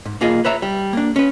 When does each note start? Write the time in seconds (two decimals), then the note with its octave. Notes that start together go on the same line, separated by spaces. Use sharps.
0.05 G#2
0.21 B1 A#3 F4 G#4 D#5
0.45 B4 C#5 E5 A#5
0.62 G3
0.93 A#3 D4
1.16 C#4 B4